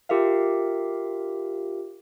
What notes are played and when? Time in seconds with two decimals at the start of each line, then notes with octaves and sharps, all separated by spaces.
0.09 F4 G4 A#4 E5 F5